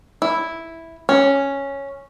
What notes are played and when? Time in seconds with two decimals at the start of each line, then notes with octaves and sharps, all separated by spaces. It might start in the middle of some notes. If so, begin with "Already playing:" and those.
0.22 E4
1.09 C#4